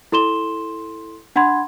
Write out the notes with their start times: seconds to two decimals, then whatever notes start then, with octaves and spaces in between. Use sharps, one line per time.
0.12 E4 A4 C6 E7 G7
1.36 D4 F#5 B5 C6 G#6